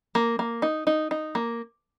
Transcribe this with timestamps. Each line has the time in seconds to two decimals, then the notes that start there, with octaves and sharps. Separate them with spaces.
0.15 A#3
0.39 A#3
0.62 D#4
0.87 D#4
1.11 D#4
1.35 A#3